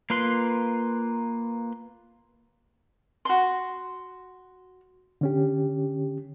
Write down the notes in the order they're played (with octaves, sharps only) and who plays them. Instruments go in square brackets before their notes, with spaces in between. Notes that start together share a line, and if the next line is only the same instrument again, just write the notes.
[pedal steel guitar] A#3 F4 B4 C6
[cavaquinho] F#4 C6
[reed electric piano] D3 C#4 G4